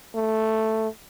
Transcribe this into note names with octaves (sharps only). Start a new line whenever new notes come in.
A3